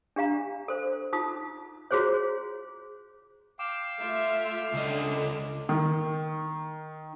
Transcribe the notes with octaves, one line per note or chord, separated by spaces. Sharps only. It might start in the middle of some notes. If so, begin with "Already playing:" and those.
D4 G4 F5 A#5
A4 C5
D#4 F4 D#6
F4 F#4 G#4 C5 C#5
F5 G5 D6 E7
A3 F4 E5
C#2 D3 D#5
D#3